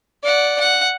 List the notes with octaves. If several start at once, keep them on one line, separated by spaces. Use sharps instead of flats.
D5 F#5
F#5